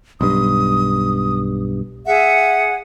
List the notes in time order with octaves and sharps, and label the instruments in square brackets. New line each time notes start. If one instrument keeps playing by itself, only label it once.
[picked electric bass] B1 G2 [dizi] D#6
[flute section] G#4 F#5 [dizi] E5